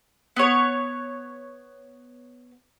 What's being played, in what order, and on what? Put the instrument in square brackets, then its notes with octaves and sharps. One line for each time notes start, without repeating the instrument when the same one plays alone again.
[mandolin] B3 C#5